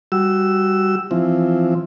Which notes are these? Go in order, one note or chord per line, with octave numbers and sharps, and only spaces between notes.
G3 F#4 E6
E3 F3 C4